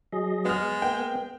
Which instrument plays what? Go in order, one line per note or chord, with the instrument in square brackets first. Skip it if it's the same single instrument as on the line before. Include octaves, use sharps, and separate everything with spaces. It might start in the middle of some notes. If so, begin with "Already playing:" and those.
[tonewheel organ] F#3 G#4 D#5
[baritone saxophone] G#3 [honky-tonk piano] B3 F6
[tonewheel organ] A#3 B3 [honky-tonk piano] G5